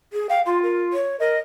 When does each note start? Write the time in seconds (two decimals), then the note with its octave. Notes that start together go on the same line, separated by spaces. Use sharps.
0.13 G#4
0.29 F5 G5
0.46 F4 C6
0.63 A#4
0.93 C#5
1.20 A#4 D#5